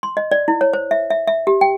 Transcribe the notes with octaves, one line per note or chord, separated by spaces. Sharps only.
C6
D#5
D5
E4
C#5
C5
E5
E5
E5
G4
G5